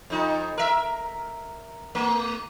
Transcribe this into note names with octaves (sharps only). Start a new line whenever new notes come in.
F2 D#4
A#4 E5
A3